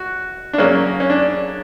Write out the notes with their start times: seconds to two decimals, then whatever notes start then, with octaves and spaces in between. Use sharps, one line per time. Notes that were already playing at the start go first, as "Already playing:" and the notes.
Already playing: F#4
0.53 D4
0.58 C#3 F#3 A#3 C#4
1.00 C#4
1.10 D4